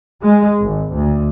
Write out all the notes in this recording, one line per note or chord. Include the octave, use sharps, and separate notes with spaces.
G#3
G#1
D2